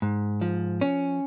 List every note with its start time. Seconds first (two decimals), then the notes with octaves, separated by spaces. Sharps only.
0.02 G#2
0.41 F3
0.81 C#4